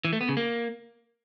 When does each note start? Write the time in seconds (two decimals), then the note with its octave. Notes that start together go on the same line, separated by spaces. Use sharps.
0.05 E3
0.13 A3
0.21 B3
0.29 C#3
0.37 A#3